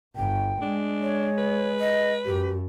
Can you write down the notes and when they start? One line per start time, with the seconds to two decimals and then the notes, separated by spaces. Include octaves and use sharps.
0.16 G1 G5
0.61 G#3 D4
1.02 C#5
1.38 B4
1.80 D#5
2.25 F#2 G4